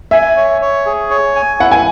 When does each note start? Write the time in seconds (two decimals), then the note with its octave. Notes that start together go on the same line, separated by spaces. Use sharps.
0.11 E5 G#5
0.37 C#5
0.62 C#5
0.86 G#4
1.11 C#5
1.36 G#5
1.60 E4 F#5
1.71 G#5